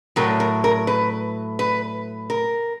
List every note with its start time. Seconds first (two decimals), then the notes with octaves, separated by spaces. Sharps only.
0.16 A2 F#3 A3 A#4
0.40 A#4
0.64 A#4
0.87 B4
1.59 B4
2.30 A#4